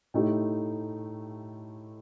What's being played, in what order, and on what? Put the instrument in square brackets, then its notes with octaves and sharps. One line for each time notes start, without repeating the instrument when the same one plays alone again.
[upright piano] A2 A3 D#4 G4